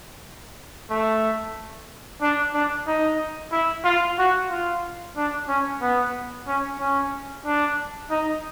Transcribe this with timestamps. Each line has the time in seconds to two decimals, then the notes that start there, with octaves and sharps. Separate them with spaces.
0.90 A3
2.22 D4
2.54 D4
2.87 D#4
3.52 E4
3.85 F4
4.19 F#4
4.51 F4
5.17 D4
5.49 C#4
5.82 B3
6.48 C#4
6.79 C#4
7.46 D4
8.11 D#4